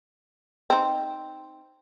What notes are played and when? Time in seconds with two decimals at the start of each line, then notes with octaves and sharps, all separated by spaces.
0.70 C4 D#4